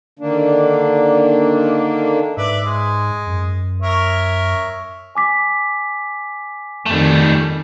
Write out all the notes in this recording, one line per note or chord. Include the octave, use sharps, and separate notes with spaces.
D3 D#3 A#3 D4
G#2 B4 D5 E5
G#3
F#2
A#4 C#5 E5
G#5 D6 B6
F2 D#3 G3 A3